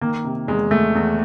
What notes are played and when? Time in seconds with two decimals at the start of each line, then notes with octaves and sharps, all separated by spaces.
0.01 D#3 A#3
0.24 C3
0.48 E2 G#3
0.71 E2 A3
0.95 E2